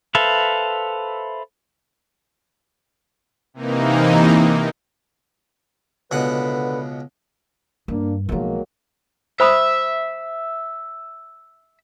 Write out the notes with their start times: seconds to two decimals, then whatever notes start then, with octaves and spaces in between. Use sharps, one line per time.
0.15 A4 B4 C5 E5 F5
3.54 C3 E3 A#3 D#4
6.11 C#2 B2 D3 B4 F#5
7.88 G2 A#3 D4
8.29 B1 F3 F#3 G#3 A#3
9.40 C5 E5 B5 D#6